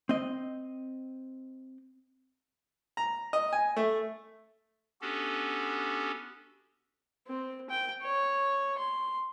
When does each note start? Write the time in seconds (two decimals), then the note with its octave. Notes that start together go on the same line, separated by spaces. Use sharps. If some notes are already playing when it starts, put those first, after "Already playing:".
0.09 C4 D#5
2.97 A#5
3.33 D#5
3.53 G#5
3.76 A3
5.01 B3 C#4 D4 F#4 G4 A4
7.27 C4
7.70 G5
8.03 C#5
8.79 C6